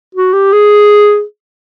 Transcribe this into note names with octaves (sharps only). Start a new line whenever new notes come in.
F#4
G4
G#4